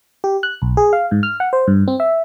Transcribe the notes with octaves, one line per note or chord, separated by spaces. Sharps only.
G4
F#6
B1
G#4
F5
G#2
F6
F#5
C5
G2
C4
E5